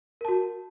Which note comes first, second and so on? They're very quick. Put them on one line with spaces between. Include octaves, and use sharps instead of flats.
A#4 A5 F#4